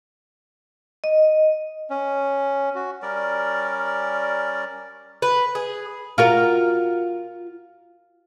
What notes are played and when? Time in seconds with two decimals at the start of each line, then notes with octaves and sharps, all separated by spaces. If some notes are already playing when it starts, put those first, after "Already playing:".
1.04 D#5
1.90 C#4
2.75 F#4
3.02 G3 C#4 A#4 D5
5.22 B4
5.55 G#4
6.18 F4 F#4 A#4